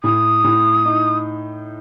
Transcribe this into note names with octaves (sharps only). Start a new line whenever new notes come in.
A2 D#6
A2
D#4